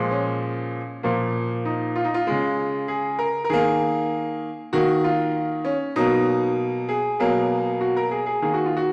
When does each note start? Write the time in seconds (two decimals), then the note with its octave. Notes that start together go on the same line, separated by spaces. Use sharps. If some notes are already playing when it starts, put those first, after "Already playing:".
Already playing: A#2 F3 G#3
0.11 C#4
1.03 A#2 F3 A#3
1.65 D#4
1.95 F4
2.04 D#4
2.14 F4
2.27 C#3 G#3
2.88 G#4
3.19 A#4
3.45 A#4
3.49 D#3 A#3 G#4
4.73 D#3 A#3 F#4
5.04 F4
5.65 C#4
5.96 B2 F#3 A#3 D#4
6.89 G#4
7.19 B2 F#3 A#3
7.81 F#4
7.96 A#4
8.11 G#4
8.26 G#4
8.42 D#3 A#3 G#4
8.54 F#4
8.66 F4
8.77 F#4